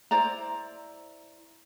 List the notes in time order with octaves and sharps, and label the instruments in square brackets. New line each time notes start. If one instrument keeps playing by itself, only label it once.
[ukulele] E4 C5 D5 A#5